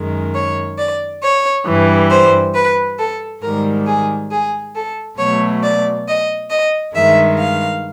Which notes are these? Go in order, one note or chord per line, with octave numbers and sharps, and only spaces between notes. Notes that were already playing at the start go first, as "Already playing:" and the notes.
Already playing: F#2 D#3 G#3
C#5
D5
C#5
G2 E3 G3
C5
B4
A4
G#2 D#3 G3 A#4
G#4
G#4
A4
B2 F#3 A3 C#5
D5
D#5
D#5
G2 D#3 G#3 E5
F5